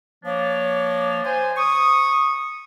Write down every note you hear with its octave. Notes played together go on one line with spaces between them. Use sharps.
F3 A#3 D4 C#5
C5 G#5
C#6 D#6